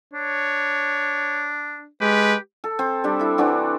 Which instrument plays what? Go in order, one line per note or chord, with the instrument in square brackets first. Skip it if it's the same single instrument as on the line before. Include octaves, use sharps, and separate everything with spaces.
[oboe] D4 [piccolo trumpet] C#5
[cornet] G#3 [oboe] G4 [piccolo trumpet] B4
[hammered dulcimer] A4
C4 C5
G3 D4 G4
E4 A4
E3 C4 D4 F#4